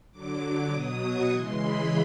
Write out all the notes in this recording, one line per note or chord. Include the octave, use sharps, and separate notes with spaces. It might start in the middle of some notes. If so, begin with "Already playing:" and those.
D3 F#3 D6
D6
B2 F#3 D#6
C#6
C#3 E3 G#3 C6
B5